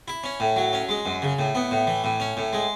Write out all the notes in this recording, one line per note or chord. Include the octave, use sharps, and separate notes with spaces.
E4
C#4
A2
F#3
C#4
G#3
F#2
C#3
A2
B3
A2
E3
A2
C#4
A2
G#3